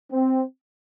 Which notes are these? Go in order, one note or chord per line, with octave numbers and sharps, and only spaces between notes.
C4